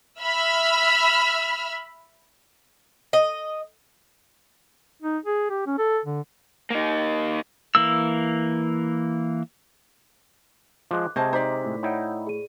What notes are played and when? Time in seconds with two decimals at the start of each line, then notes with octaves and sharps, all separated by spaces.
0.21 E5 B5 E6 F6
3.13 D#5
5.02 D#4
5.26 G#4
5.50 G4
5.67 C#4
5.78 A4
6.05 D3
6.70 A#3 D#4
7.75 E3 A#3 E6
10.91 F3 G#3 D6 F#6
11.16 C3 G#3 C5 D#5 A5 C#6 G#6
11.33 D#4 C5 D5 D#5 A#5 D6 B6
11.64 A2
11.83 D#4 E4 C#5 F#5 G5 D#6
12.27 G#4 D#7